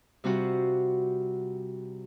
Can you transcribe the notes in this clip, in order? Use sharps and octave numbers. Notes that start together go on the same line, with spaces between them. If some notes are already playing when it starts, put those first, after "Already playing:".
C3 G3 C4 F4 F#4 F#5